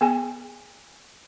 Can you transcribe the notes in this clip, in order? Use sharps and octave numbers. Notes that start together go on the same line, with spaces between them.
B3 G#4 G#5